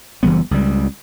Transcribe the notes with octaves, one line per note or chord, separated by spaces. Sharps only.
F#1 E3 G3 B3
C#2 G3